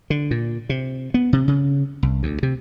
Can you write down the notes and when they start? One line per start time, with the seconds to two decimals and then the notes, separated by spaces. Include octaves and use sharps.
0.10 D3
0.31 A#2
0.69 C3
1.14 B3
1.33 C3
1.48 C#3
2.03 C2
2.23 D2
2.43 C3